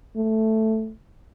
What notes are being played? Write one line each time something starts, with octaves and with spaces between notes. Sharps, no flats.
A3